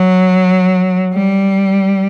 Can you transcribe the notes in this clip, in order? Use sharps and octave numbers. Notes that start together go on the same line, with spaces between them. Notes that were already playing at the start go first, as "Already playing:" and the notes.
Already playing: F#3
G3